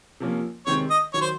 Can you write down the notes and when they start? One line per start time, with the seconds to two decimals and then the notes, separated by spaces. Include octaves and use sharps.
0.20 C3 F3 A#3 C#4
0.67 C3 D#3 G#3 C4 C#5
0.91 D#5
1.14 D#3 F#3 C#5
1.21 C5